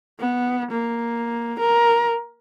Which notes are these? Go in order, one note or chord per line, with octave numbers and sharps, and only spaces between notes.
B3
A#3
A#4